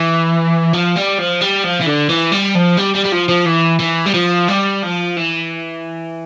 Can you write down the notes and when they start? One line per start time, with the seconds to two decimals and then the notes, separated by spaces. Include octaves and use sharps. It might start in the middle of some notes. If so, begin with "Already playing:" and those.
Already playing: E3
0.73 F3
0.96 G3
1.18 F3
1.41 G3
1.64 F3
1.80 E3
1.86 D3
2.09 E3
2.32 G3
2.55 F3
2.77 G3
2.95 G3
3.05 G3
3.12 F3
3.29 F3
3.46 E3
3.80 E3
4.06 G3
4.14 F3
4.48 G3
4.83 F3
5.17 E3